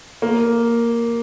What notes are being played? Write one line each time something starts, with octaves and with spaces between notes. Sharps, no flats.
A#3